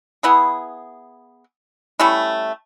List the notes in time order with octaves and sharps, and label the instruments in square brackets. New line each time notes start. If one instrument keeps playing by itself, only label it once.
[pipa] B3 E4 G#4
G3 A3 C#4 E4